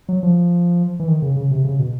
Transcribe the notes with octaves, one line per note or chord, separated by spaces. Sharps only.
F#3
F3
E3
D#3
C#3
C#3
C3
C#3
B2